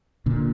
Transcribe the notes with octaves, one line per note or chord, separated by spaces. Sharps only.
A#2 D3